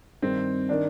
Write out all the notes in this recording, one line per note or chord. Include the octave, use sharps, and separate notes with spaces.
G2 D#3 C4
D#3 D4